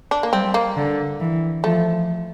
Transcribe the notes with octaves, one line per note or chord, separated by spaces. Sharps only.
D4
A#3
G3 C4
A#3
D3
E3
F3 A3